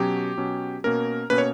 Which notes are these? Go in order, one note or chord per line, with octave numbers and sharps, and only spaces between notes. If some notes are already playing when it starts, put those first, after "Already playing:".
Already playing: B2 F#3 C#4 G4
B2 F#3 C#4
B2 A#3 C#4 A#4
B2 A#3 C#4 B4
C#5